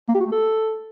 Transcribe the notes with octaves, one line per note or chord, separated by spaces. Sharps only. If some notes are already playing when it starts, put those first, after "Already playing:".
A#3
G4
F#4
A3
A4